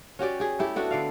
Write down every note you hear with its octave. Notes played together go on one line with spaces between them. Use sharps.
C#4 F#4 G4 D5
G4 G#4
A3 E4 G4
B3 D4 F#4 A4
D3 D5 F5